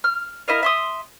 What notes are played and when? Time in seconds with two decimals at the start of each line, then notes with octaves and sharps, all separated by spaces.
0.04 F6
0.48 E4 A#4 D#5 F5
0.63 E5 C6 D#6